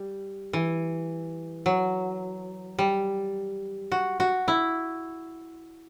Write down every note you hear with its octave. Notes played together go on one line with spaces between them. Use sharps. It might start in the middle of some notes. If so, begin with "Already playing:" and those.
Already playing: G3
E3
F#3
G3
F#4
F#4
E4